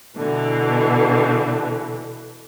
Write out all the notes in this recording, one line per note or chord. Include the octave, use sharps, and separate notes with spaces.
B2 D3 E3